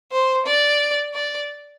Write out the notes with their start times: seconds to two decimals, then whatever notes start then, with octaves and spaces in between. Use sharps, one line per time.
0.11 C5
0.46 D5
1.14 D5